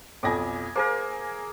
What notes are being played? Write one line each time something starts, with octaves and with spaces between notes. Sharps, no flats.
B1 F2 G#5 D6 A#6
A#3 G#4 A#4 C5